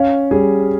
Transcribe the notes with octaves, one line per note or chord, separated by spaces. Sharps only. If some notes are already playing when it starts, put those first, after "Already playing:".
Already playing: C#4 F5
G3 G#4